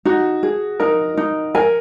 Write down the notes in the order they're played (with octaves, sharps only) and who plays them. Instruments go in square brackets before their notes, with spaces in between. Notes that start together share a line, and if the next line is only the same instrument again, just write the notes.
[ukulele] D#4 [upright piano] F#4
[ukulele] G#4
[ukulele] D#4 [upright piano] A#4
[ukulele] D#4
[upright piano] A#4 [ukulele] G#5